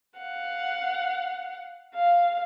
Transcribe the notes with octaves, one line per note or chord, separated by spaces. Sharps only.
F5 F#5
F5